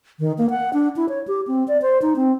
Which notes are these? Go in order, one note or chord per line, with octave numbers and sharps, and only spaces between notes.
D#3
A#3
F#5
D4
E4
C#5
G4
C4
D5
C5
D#4
C4